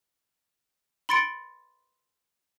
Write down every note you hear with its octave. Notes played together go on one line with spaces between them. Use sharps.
B5 C6 A6 C#7 D7